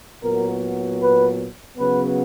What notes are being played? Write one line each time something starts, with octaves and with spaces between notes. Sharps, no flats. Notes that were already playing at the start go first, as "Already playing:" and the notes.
A#2 F#3 B3 A#4
B4
C#3 F#3 B3 B4